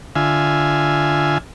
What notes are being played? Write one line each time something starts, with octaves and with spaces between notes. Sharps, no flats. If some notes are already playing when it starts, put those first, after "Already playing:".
D3 F4 E5 G#5